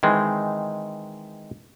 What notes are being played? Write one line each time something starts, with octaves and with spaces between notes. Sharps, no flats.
D#3 E3 G#3 C4